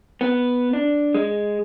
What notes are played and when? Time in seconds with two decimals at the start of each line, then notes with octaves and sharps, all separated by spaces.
0.21 B3
0.73 D4
1.14 G#3